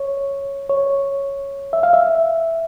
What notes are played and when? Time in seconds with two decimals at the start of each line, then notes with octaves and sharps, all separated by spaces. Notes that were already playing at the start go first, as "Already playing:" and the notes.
Already playing: C#5
0.69 C#5
1.73 E5
1.83 F5
1.93 E5